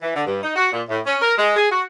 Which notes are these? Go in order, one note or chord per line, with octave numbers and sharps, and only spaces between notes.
E3
D3
G2
D#4
F#4
A#2
A2
C#4
A#4
G#3
G#4
F#4